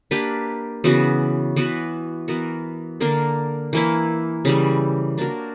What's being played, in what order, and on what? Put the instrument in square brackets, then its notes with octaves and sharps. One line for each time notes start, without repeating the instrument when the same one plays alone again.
[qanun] A#3 D4 G4 B4
C#3 E3 B3 F#4
E3 B3 F#4 B4
E3 B3 F#4 A#4
D3 A#3 D4 A#4
E3 A#3 E4
C#3 E3 G3
A#3 D4 F#4 A#4